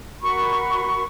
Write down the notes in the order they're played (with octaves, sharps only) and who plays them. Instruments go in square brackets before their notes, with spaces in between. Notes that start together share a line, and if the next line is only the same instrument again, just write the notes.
[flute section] F#4 A#4 B5 C#6